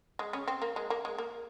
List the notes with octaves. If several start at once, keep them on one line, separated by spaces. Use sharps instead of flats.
G#3
C#3 C#4
C4
A#3
G#3
A#3
G#3
A#3